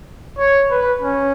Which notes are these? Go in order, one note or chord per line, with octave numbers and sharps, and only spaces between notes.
C#5
B4
C#4